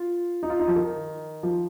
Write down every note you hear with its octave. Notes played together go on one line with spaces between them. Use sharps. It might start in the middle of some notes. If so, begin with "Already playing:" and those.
Already playing: F4
D#4
F4
D#4
F3
D#3
F3